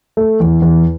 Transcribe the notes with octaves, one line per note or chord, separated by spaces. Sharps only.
A3
E2
E2